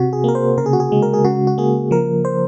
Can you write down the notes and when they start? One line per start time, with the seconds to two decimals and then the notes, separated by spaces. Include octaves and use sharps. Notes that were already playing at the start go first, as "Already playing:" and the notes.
Already playing: C3 F#4
0.13 G#4
0.24 A#3 A#4
0.35 C5
0.57 C#3 A#4
0.66 G#4
0.73 F#4
0.80 G#4
0.92 G#3
1.02 A#4
1.13 G#4
1.24 C#3 F#4
1.47 F#4
1.58 A#3 G#4
1.91 F3 A#4
2.25 C5